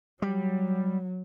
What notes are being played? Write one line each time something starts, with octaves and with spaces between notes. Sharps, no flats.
F#3 G3